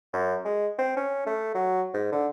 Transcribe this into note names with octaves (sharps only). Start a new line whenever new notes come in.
F#2
G#3
C4
C#4
A3
F#3
G#2
D3